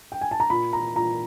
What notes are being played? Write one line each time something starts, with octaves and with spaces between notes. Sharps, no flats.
G5
G#5
A5
A#5
A#2 B5
A#5
A#2 A#5